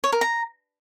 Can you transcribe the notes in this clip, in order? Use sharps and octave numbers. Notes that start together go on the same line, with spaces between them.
C#5
A#4
A#5